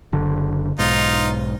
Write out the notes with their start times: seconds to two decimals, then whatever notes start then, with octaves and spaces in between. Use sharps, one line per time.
0.13 F#1 D3
0.79 B1 G#2 D#4 F4